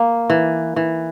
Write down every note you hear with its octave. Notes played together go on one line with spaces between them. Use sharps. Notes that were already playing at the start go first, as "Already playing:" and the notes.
Already playing: A#3
E3
E3